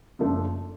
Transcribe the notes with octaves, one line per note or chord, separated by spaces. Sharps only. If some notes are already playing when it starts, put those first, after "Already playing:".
F#1 F#2 F3 A3 D4